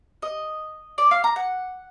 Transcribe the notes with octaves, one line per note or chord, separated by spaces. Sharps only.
D#5
D5
F5
A#5
F#5